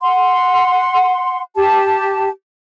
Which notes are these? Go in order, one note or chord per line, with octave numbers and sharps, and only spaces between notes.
F#5 C6
G4 A5